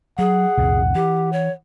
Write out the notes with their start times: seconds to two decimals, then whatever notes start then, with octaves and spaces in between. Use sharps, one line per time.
0.19 F#3 G#4 F#5
0.57 C2 F2 A#2
0.95 E3 G4
1.33 C#5